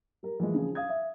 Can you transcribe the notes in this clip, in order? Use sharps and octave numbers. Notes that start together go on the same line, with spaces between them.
G3 A#4
E3 F3 G#3
C#3 F3 G#4
F5 D#6 G#6
E5